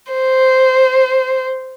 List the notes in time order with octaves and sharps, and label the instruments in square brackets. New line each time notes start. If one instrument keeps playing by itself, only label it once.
[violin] C5